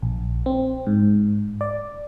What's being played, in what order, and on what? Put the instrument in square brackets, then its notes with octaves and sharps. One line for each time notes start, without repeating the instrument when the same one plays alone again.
[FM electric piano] A#1
C4
G#2
D5